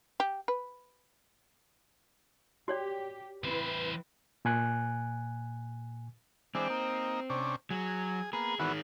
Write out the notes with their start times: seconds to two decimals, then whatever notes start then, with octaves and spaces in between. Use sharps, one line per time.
0.20 G4
0.48 B4
2.68 F#4 G4 C#5 D5
3.44 E3 C4 E4 B4 C5
4.45 A#2 G#5 F#6
6.55 E3 G#3 C4 D4
6.70 A#3 D#4
7.30 C3 C#4 D4
7.70 F#3 G#4
8.33 A#3 B3 G#4
8.59 D#3 E3 B3 F#4 G#4